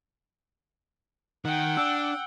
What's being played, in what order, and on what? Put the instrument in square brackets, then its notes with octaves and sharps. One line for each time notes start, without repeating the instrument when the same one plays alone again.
[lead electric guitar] D#3 [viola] F#5 G5
[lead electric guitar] D4 [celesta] E6